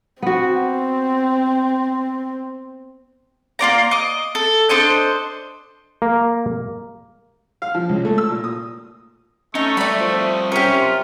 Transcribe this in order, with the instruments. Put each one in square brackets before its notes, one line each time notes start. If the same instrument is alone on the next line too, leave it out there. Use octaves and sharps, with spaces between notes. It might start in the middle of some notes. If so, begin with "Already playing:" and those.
[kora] B3 F#4 [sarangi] C4
[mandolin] A#3 F4 D5 A#5
D#5 D6
A4
D4 A4 C5 D#5
[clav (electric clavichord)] A#3
[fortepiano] F5
F3
C#2
A3
E6
A#2
D#6
[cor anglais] A3 [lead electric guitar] C#4 [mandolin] D#4
[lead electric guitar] G3 E5 [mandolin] D5 B5
[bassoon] F3
[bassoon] C3 [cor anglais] C#4 [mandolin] G4 A#4
[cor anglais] F4